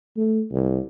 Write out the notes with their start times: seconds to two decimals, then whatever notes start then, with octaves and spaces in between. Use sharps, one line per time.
0.17 A3
0.52 C2